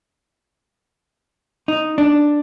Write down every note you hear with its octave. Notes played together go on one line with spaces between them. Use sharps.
D#4
D4